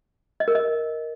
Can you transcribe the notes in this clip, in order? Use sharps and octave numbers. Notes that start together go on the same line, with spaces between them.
D#5
A#4
D#5